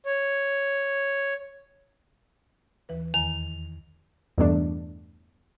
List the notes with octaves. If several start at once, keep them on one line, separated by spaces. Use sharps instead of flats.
C#5
D#2 E3 B4
E2 D#3 A#5 F7
E2 G2 B2 A3 D4